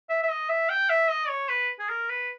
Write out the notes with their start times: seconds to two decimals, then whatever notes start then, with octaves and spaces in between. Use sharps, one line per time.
0.10 E5
0.23 E5
0.29 D#5
0.49 E5
0.69 G5
0.89 E5
1.10 D#5
1.28 C#5
1.49 B4
1.79 G#4
1.89 A#4
2.09 B4